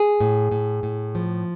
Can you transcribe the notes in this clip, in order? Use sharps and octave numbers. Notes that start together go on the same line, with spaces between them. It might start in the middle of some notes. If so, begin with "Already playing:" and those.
Already playing: G#4
A2
A2
A2
F3